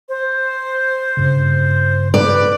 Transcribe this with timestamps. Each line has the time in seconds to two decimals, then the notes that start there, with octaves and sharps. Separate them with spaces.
0.09 C5
1.17 G2 C#3
2.14 B4 D5